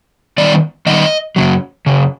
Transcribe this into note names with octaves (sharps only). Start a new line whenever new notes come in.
D#3 G3 B3 D#4 D5
D#3 G3 B3 D#4 D#5
F#2 C#3 F#3
F#2 C#3